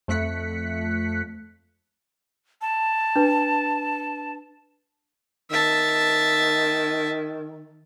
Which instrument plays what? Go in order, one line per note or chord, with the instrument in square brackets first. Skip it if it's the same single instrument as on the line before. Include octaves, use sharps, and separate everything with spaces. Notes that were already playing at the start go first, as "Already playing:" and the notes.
[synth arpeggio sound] F2 A3 F#6 B6 C#7
[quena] A5
[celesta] D4 B4
[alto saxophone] D#3 [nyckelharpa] E5 A5